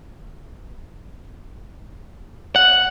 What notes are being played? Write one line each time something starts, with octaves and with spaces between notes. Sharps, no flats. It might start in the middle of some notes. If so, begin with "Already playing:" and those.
F#5